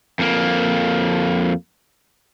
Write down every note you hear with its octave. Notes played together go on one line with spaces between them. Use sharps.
F2 A#3